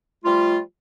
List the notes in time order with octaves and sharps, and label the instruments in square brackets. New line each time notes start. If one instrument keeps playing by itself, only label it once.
[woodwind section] F3 G3 A3 F4